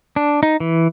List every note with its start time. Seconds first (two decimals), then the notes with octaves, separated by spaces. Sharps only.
0.16 D4
0.43 D#4
0.60 E3